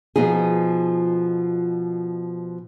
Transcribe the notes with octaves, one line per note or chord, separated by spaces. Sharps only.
B2 F3 D#4 G#4